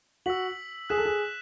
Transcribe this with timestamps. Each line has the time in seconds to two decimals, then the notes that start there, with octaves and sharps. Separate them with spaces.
0.26 F#4 E6 B6 F#7
0.90 G#4 F#6 B6 E7
0.98 A4
1.05 G#4